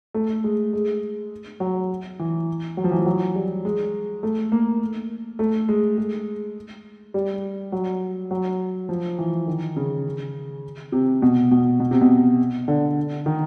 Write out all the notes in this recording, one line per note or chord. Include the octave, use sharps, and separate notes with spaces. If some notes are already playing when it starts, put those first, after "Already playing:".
A3
G#3
G#3
F#3
E3
F#3
F3
E3
F3
F#3
G3
G#3
A3
A#3
A3
G#3
G#3
G3
F#3
F#3
F3
E3
D#3
C#3
C3
B2
B2
B2
C3
B2
D3
D#3